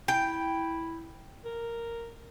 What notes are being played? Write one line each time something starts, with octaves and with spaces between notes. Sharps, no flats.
E4 G5
A#4